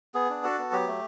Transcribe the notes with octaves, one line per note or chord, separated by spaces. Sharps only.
B3 G#4
D4
F#4 A4
B3
F#3 G4
A3